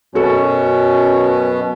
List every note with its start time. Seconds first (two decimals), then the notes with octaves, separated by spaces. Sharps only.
0.15 F#2 B2 C#4 F#4 A4